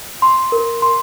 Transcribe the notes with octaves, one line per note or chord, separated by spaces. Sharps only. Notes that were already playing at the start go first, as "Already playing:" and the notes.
C6
A#4
C6